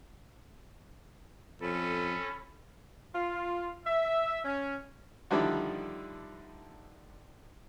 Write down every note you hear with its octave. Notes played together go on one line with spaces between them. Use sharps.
F2 C#4 A4 B5
F4
E5
C#4
D3 D#3 F3 G3 D4 E4